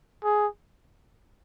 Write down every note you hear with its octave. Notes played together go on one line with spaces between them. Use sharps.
G#4